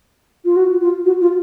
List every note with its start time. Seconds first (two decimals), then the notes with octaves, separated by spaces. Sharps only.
0.45 F4
0.56 F#4
0.81 F4
1.05 F#4
1.21 F4